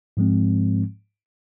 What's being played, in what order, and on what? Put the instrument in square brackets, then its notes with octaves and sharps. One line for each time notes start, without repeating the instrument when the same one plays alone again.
[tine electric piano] G#2 F3 G#3 C4